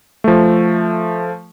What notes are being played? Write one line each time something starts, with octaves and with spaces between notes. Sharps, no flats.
F3 A3